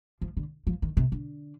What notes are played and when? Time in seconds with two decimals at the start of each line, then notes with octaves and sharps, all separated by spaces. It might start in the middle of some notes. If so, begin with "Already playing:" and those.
0.21 F3
0.37 D3
0.67 F3
0.82 D#3
0.97 C3
1.12 D3